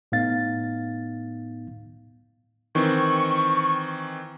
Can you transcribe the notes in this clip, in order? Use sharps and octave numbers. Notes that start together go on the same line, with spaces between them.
A2 B3 D#4 F5 A6
D#3 E3 C4 C#6